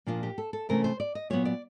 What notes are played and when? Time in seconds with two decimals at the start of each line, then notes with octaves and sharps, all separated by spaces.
0.06 A#2 F3 A#3 D4 F4
0.23 G4
0.38 A4
0.53 A4
0.69 C3 E3 A3 C#4 E4 A#4
0.84 C5
1.00 D5
1.15 D#5
1.30 A#2 F#3 B3 C#5
1.45 D5